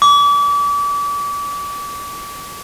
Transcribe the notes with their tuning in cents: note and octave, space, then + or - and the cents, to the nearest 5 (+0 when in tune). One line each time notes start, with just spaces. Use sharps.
D6 -35